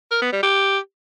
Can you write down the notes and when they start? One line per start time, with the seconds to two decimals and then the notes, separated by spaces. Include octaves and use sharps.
0.11 A#4
0.22 B3
0.32 G3
0.43 G4